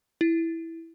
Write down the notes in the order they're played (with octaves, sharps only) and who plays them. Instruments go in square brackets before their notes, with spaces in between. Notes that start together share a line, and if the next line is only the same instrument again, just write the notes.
[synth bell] E4